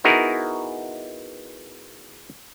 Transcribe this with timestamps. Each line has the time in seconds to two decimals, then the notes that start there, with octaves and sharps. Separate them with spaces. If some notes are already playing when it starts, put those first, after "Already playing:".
0.04 B3 D#4 E4 F#4 G#4 A#4